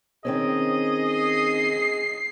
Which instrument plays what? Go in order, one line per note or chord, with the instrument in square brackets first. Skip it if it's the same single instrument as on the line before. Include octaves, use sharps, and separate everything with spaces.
[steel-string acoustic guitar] D#3 C4 C#4 [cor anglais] G#4 [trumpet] D#5
[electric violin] C7